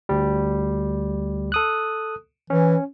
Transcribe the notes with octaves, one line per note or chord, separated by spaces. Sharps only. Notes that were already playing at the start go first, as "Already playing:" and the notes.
D2 G3
A4 D#6 F#6
E3 C#4